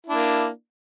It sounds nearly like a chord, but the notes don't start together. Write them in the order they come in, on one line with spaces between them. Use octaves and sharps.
E4 D4 A#3